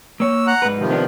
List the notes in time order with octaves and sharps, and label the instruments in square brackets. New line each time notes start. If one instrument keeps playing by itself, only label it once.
[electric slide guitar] A#3 C#5 [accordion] E6
[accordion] F#5 A#5 F#6
[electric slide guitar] G#2 B4
[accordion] C3 D#3 F3
[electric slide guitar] B3 D4